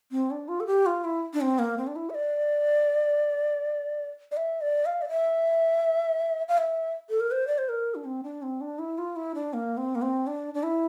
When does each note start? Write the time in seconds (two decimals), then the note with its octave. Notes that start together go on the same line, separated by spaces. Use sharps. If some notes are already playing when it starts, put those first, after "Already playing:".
0.12 C4
0.31 D4
0.48 F4
0.60 A4
0.67 G4
0.86 F4
1.04 E4
1.34 D4
1.41 C4
1.59 A#3
1.78 C4
1.87 D4
1.96 E4
2.10 E5
2.15 D5
4.32 D5
4.37 E5
4.61 D5
4.86 F5
5.02 D5
5.10 E5
6.49 F5
6.58 E5
7.09 A4
7.20 A#4
7.31 C5
7.47 D5
7.58 C5
7.69 A#4
7.95 D4
8.05 C4
8.23 D4
8.42 C4
8.61 D4
8.79 E4
8.98 F4
9.16 E4
9.35 D4
9.53 A#3
9.77 C4
9.95 A#3
10.02 C4
10.27 D4
10.54 D4
10.63 E4